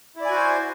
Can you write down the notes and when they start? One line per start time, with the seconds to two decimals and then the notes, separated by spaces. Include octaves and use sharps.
0.16 E4
0.21 D5
0.25 G#5
0.30 F#4
0.35 C5